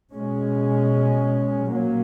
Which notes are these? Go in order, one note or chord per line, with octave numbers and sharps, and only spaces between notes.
B2 G#3 C#4
A#2 F#3 A#3 C#4